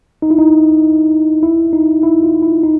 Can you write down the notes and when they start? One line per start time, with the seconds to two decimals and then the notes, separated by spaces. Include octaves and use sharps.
0.22 D#4
0.31 E4
0.38 D#4
1.43 E4
1.73 D#4
2.03 E4
2.23 F4
2.43 E4
2.63 D#4